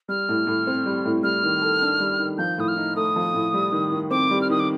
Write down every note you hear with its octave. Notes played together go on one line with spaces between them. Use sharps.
G3 F6
A2
A2
C4
G3
A2
G3 F6
D#3
A4
D4
G3
D#3
F3 G6
A2 D#6
F6
D#4
A3 D#6
F3
A2
G3
D#3
D#3
C4 D6
G3
F6
D#3 D#6
D6